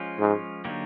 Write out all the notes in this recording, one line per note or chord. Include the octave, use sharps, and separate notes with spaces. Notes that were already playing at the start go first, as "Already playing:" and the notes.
Already playing: F3 G#3 C#4 F4
G#2
D3 F#3 A#3 D#4 G4